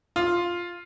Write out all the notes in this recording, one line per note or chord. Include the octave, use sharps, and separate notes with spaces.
F4